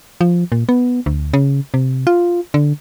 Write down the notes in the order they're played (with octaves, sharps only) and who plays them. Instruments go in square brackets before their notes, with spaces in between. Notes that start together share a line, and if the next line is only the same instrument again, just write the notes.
[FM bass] F3
A#2
B3
D2
C#3
C3
F4
D3